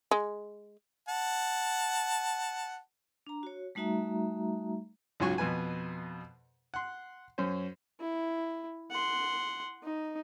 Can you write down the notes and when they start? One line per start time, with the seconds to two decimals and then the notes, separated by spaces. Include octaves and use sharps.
0.11 G#3
1.08 F#5 A5
3.27 D4 A#5
3.43 F#4 C#5
3.75 G3 A3 D#4 F#4 E5 A#5
5.20 C#2 G#2 F#3 F4 G#5 C#6
5.38 F2 B2 B4 G#5
6.74 F#5 C6
7.38 F#2 C#4 C5
8.00 E4
8.91 F#5 C6
9.83 D#4